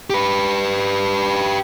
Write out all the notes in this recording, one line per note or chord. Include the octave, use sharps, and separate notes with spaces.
G4 B4